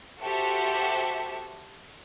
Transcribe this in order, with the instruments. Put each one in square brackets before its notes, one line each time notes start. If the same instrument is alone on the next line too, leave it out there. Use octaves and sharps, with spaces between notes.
[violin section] F#4 G4 A4 C5 E5